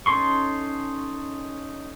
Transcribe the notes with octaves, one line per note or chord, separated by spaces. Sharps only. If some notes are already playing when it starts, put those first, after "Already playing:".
C#4 D#4 A4 C6 C#6